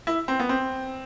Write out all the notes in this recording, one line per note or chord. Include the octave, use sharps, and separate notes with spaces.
E4
C4
B3
C4